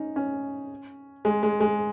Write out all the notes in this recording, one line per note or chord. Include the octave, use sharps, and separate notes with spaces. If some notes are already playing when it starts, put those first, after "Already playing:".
Already playing: C#4 D#4
C#4
G#3
G#3
G#3